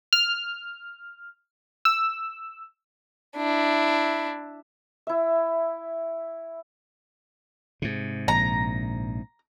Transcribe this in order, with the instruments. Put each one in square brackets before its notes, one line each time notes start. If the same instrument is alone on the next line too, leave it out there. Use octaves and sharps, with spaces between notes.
[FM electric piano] F6
E6
[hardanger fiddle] D4 E4
[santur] E4 E5
[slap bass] G#2 C3
[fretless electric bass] A#1 [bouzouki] A#5